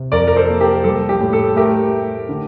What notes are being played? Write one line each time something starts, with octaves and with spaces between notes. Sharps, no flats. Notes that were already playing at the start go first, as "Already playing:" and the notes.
Already playing: C3
F2 A#4 D5
A#4
A4 C5
A#3
G4 A#4
G3 A4
G4
A2
A4
A3 G4 A#4
A3
D3